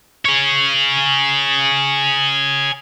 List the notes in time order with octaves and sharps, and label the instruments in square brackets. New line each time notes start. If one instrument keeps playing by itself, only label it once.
[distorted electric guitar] G#4 C#5